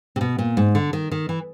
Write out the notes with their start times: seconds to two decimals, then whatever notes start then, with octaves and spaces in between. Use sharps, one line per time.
0.16 C3
0.21 B2
0.38 A#2
0.57 G#2
0.75 D3
0.93 D#3
1.11 D#3
1.29 E3